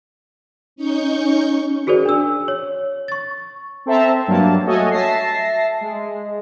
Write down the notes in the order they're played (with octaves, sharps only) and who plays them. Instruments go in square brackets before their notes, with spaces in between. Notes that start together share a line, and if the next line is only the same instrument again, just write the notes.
[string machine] C#4 D#4 C#6 G6
[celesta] F#4 G#4 A#4 C5 D5
D4 E6
C#5
C#6 A6
[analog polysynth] C4 A4 C5 E5 A5 A#5
G2 F#3 A#3 A5
A3 F#4 A4 C#5 D#5 G#5
E5 A5 A#6 C7
G#3